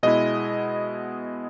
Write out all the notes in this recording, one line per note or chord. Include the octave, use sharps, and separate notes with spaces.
B2 G#3 B3 E4 D#5